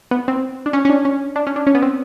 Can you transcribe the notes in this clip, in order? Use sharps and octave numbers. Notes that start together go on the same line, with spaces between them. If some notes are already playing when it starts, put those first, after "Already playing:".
B3
C4
D4
C#4
C#4
D4
C#4
D4
C#4
D4
C#4
B3
C4